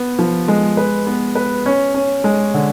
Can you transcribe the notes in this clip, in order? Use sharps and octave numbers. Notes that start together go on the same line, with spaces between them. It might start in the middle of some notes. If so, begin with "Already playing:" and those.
Already playing: B3
F3
G#3
B4
B3
B4
C#4
C#4
G#3
D3